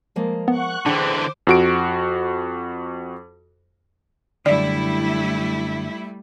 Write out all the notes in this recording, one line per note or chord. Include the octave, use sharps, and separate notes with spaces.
F3 G#3 A#3
B3 F#5 C#6 F#6
D3 E3 D4 G#4 C5 G5 D6
F2 F#4 D7
F#2 D3 G3 A3 E4 D5